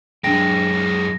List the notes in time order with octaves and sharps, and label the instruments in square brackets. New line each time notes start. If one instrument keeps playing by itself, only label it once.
[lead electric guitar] F#2 G#3 [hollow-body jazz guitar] D4 G5 [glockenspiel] A#6